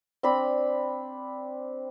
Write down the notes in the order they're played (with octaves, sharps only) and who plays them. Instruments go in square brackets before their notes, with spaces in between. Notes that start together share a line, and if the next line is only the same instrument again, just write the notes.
[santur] C4 D4 B5